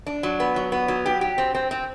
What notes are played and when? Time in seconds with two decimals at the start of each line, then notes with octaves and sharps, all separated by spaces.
0.07 D4
0.23 F#3
0.40 B3
0.56 F#3
0.72 B3
0.88 F#3
1.06 G4
1.21 G4
1.38 C4
1.55 C4
1.71 C4